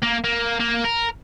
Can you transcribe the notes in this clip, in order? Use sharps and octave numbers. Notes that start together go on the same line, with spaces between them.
A#3
A#3
A#3
A#4